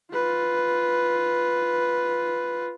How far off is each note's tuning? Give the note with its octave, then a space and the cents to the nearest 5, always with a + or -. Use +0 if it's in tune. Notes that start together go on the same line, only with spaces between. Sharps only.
F4 +0 B4 +0